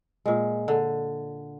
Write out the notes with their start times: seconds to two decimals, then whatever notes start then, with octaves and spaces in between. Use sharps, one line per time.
0.26 A#2 G#3
0.68 D3